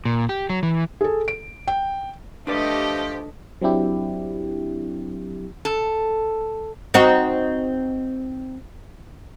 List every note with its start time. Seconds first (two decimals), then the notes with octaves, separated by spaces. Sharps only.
0.05 A#2
0.29 G4
0.50 F#3
0.63 E3
1.01 G#4 A4
1.28 D7
1.68 G5
2.47 F3 A3 D4 G4 B4 D5 D#5
3.61 F#3 C4 D4 E4 G4
5.65 A4
6.94 C4 D#4 F#4